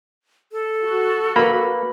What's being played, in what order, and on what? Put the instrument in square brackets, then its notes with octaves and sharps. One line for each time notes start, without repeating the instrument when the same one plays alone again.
[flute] A4
[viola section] F#4
[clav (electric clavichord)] A#3 [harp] B4 B5